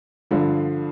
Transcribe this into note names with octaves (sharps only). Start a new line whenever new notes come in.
G2 D3 F3